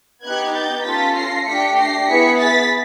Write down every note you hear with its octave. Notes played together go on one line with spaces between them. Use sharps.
B3 D#4 G4 F#6 G#6
G6 A6
C#4 F4 A4 A6 B6
A#6 C7
A3 D4 G4 B6 C#7
A#6 C7
B3 E4 G#4 B6 C#7
A6 B6